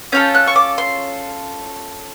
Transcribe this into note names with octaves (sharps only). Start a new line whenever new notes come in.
C#4 F4 A4 G6
F#6
C#6
D6
C6